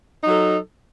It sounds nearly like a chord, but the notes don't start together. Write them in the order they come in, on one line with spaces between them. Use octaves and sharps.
D#4 F#3 A4